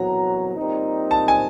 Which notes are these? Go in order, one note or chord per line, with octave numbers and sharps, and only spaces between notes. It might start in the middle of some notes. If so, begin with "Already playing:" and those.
Already playing: C2 B2 F#3 A#5
A#2 G3 C4 D#4
A5
G#5